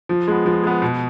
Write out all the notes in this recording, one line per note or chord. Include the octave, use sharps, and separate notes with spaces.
F3
G#3 B3
F3
G#3 B3
B2